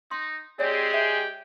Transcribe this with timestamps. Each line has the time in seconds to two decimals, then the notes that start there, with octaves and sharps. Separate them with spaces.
0.11 D#4 C6
0.59 G#3 C4 G4 G#4 C#5 D5
0.94 E5 G5